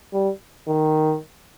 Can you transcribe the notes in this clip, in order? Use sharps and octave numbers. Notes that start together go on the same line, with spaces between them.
G3
D#3